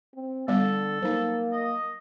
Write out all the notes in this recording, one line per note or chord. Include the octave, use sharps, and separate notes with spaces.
C4
D3 G3 B3 A4
F#3 A#3 D#4
D#5